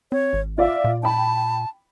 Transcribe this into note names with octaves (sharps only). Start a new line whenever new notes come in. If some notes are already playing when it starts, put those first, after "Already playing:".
C4 C#5
G#1
F4 D5 E5 F5
A#2
G5 A5 B5